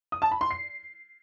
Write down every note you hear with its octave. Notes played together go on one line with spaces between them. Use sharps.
D#6
A5
B5
C6
C7